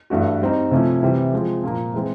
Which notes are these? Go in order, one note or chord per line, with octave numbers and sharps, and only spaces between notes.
G2 E3 A3 D4 F#4
G3 C4 D#4
C3 F3 A3 C#4 E4
C3 E3 G3 C4
F3 G#3 C4
A#2 F3 A#3
E3 G#3 C4